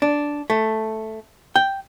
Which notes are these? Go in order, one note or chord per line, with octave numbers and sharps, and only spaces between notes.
D4
A3
G5